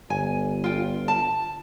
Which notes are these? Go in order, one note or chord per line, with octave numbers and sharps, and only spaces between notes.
G1 G#5
F4 G5
A5